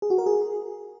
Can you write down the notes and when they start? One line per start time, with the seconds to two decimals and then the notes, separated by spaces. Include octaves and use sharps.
0.02 G#4
0.10 F#4
0.18 A#4
0.26 G#4